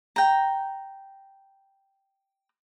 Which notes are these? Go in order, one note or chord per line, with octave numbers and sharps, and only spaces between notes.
G5 A#5